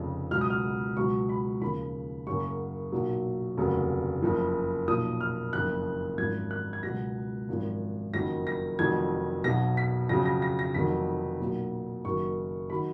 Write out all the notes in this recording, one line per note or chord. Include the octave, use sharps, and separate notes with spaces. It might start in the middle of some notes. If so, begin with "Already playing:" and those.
Already playing: F1 F2 C#3 F3
C#2 B2 F#3 F6
D#6
F6
C#2 B2 F#3 C#6
B5
D#2 C#3 F3 B5
F#1 F#2 C#3 F#3 C#6
B1 A#2 F#3
F1 D#2 C#3 F#3
F#1 F2 F3
B1 A#2 F3 D#6
F6
F#1 F2 F3 F#6
G#1 F#2 F3 G#6
F#6
G#6
C#2 B2 F#3 A#6
G#1 F#2 F3
F#1 F2 D#3 F#3 A#6
A#6
F1 F2 D#3 F#3 G#6
B1 B2 F#3 A#6
B6
F2 C#3 F#3 A#6
A#6
A#6
A#6
F1 F2 D#3 F#3 B6
B1 A#2 F#3
F#1 F#2 D#3 F#3 C#6
D#3 F#3 B5